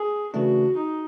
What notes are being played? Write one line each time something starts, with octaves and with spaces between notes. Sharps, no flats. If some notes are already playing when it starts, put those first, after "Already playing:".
Already playing: G#4
C#3 E3 A3 D4 F#4
D#4